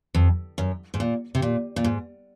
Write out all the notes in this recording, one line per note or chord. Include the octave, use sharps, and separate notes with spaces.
F2
F#2
G#2
A#2
C3
A#2
A#2
G#2